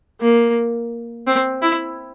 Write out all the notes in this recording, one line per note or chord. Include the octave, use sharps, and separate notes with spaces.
A#3
C4
E4